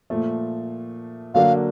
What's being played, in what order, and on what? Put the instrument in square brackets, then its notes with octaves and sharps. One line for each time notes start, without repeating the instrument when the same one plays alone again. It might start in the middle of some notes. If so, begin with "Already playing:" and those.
[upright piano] A#2 F3 A3
[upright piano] D3 F#3 A#3 D4 [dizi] F5